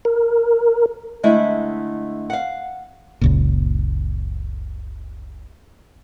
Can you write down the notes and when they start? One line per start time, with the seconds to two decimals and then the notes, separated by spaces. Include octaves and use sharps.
0.05 A#4
1.23 D3 G#3 A3 E4 E5
2.30 F5 F#5
3.21 F#1 C#2 A#2